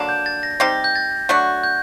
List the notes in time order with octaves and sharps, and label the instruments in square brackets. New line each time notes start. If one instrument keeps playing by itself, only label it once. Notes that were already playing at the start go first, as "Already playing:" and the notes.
Already playing: [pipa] D3 F#3 A#3 D4
[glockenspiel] G6
A6
A#6
[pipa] G3 C4 D#4 G4 [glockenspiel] A#6
[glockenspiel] G6
A6
[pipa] F#3 A3 D4 F#4 [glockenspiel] F#6
[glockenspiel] G6